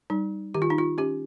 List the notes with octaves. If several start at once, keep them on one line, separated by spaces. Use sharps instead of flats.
G3 D#4
D#3 G4
F4
D#4
F4
C#4 G4